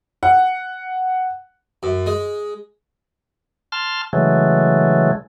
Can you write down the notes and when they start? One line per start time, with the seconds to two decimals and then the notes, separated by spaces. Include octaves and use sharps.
0.23 F#5
1.83 F#2
2.06 G#3
3.72 A5 C6 F6
4.13 C#3 E3 F#3 G#3 A3